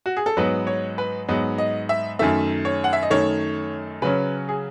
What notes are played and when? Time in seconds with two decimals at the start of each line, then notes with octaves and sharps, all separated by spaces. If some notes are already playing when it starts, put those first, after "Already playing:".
0.06 F#4
0.17 G#4
0.26 A4
0.37 G#2 F#3 B3 D#4 B4
0.67 C#5
0.98 B4
1.28 G#2 F#3 B3 D#4
1.58 D#5
1.89 E5
2.19 F#2 D#3 A3 E5
2.65 C#5
2.84 F#5
2.93 E5
3.03 D#5
3.10 F#2 D#3 A3 C#5
4.02 C#3 F#3 C#4 B4
4.49 G#4